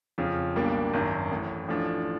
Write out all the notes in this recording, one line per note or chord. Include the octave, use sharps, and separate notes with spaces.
F2 C#3 F3
B1 B2 G3 A#3 D4
G#1 F#2 D#3
A1 A2 E3
A1 A2 F3 A3 D4